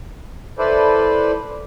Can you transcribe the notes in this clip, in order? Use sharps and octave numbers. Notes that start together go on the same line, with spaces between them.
E4 A4 B4 C5 D5